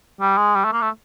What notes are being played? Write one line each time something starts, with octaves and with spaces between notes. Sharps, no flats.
G3
G#3
G3
A3
A#3
A3